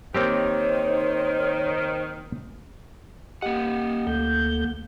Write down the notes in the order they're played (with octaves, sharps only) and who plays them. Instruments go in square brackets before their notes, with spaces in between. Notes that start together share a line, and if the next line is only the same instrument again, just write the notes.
[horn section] D#3 [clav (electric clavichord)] A#3 C4 G4 [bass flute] C5 [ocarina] C#5
[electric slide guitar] A#3 F#5 [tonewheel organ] G4 D#5
[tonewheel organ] D2 A3 G6